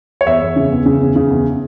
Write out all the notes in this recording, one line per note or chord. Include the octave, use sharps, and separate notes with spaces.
C#5
E2 E5
E2
C#3
E2
C#3
E2
C#3
E2